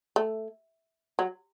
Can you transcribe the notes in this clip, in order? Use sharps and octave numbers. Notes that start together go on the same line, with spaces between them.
A3
F#3